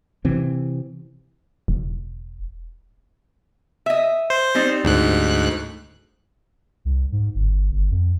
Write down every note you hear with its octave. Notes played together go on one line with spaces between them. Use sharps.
C3 E3 C4
E1
D#5 E5
C5
G3 C4 D#4
D2 G#2 F#6
C2
G#2
G1
G1
F2